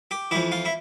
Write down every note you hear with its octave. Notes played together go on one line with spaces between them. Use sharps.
G4
F2 E3 E4
F4
E4